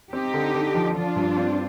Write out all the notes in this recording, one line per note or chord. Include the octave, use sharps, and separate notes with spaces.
C4 D#4 G4
D3
D3
F3
F3 D4 F4
G2
C4